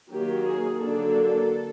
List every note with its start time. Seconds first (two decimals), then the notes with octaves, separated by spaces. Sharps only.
0.11 D#3 F#3 A#3 G4
0.47 G#4
0.83 D3 F#3 A#3 D4 A4